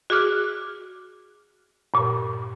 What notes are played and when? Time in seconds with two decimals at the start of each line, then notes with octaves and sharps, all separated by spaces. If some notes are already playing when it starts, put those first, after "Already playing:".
0.10 F#4 G#4 D6 F6 F#6
1.94 G2 A#2